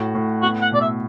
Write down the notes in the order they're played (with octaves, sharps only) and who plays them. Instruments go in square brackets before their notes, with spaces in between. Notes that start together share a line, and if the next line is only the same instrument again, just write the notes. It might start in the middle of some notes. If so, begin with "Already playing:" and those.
Already playing: [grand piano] A2 F#4
A2
[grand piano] B3 [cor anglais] F#4
[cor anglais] F#5
[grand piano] B2 [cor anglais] D5
[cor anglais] E5